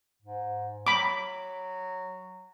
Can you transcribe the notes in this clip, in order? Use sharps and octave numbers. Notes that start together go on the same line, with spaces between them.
G#2
F#3 B5 D6